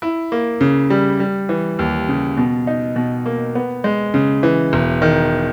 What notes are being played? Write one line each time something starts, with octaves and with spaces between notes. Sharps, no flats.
E4
A#3
C#3
G3
G3
E3
D#2
C#3
B2
D#4
B2
A#3
B3
G#3
C#3
E3
E1
D#3